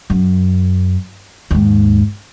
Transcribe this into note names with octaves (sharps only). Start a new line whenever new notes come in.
F#2
D#2 G#2